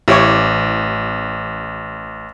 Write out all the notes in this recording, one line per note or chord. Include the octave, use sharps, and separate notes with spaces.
A1 E4 G4 C#5 D6